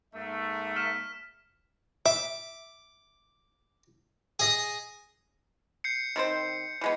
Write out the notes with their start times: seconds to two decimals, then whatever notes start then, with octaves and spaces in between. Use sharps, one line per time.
0.14 G#2 A3 A#3 E5
0.76 F6 B6 E7
2.06 E5 D6
4.39 G#4 D#5 D#6
5.84 G6 C7 C#7
6.16 D#3 C4 C5
6.81 E3 G#3 B3